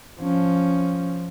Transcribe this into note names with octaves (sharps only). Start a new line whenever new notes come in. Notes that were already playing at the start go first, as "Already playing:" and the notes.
F3 C#4